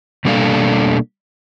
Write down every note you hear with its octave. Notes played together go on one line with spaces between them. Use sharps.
B2 G3 A#3 D4 A4 F5